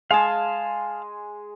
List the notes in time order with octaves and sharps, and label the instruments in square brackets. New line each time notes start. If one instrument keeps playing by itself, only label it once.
[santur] G#3 D#5 G#5 [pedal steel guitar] F5 A5